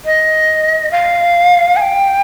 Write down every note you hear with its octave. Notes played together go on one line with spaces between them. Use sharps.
D#5
F5
G#5
G5